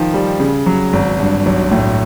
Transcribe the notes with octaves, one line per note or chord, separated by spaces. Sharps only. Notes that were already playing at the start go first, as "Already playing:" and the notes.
Already playing: D#3 F3
G3
C#3
F#3
G#1
G2
B1
A2